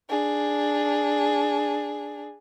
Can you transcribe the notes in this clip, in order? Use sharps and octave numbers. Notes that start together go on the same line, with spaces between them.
D4 G#4